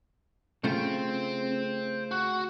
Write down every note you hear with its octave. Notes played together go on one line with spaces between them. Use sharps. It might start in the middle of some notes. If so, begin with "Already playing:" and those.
C#3 A3 F4 C5 G5
F#4